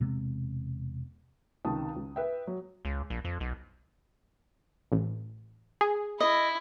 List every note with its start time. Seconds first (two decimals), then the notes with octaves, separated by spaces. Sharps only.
0.01 E1 C3 G#3 B3
1.65 C#2 C3 D#3 A5 D#6
1.96 C#2
2.16 B4 E5 G5
2.47 F#3
2.85 C#2
3.10 A#1
3.25 F2
3.40 B1
4.92 A1
5.81 G#4
6.20 E4 D#5